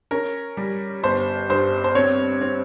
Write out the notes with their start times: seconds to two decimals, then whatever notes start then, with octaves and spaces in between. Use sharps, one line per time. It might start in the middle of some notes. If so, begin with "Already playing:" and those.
0.11 C#4 A#4
0.57 G3
1.03 G1 C5
1.49 G2 C5
1.84 C5
1.95 C4 C#5
2.41 C4